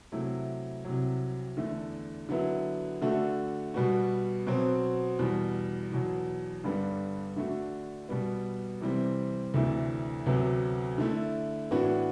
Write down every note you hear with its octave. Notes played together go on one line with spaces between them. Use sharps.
C3 F#3 A3 E4
C2 C3 F#3
E2 D3 A3
D3 F#3 B3 E4
D3 A3 D4 F#4
B2 G3 B3 F#4
B2 F#3 C4 F#4
E2 B2 G3
E2 B2 F#3
G2 D3 G3 B3 D4
D3 A3 D4 F#4
B2 G3 B3
C3 E3 G3 C4
D2 C3 E3 A3 D4
D2 C3 F#3 B3
D3 A3 E4
A2 E3 B3 D4 F#4